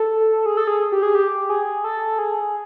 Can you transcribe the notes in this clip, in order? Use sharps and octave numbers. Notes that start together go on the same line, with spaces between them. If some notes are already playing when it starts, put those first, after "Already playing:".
Already playing: A4
G#4
A4
G#4
G4
G#4
G4
G#4
A4
G#4